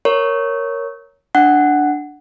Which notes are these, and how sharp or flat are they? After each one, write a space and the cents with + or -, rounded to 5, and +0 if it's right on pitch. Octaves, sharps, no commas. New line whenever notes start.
A#4 +0 C#5 +0
D4 +0 F#5 +5